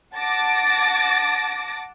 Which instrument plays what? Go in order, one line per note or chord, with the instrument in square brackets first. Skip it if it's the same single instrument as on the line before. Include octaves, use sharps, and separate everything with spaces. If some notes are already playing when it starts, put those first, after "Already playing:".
[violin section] F#5 A5 D6 A6 A#6